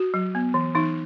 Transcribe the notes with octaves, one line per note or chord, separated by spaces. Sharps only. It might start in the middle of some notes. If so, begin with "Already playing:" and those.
Already playing: F#4
F#3
B3
E3
E3 D#4